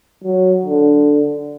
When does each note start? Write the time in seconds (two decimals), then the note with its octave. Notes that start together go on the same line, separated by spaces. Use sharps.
0.24 F#3
0.65 D3